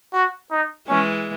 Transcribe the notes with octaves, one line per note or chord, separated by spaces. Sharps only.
F#4
D#4
E3 G#3 C#4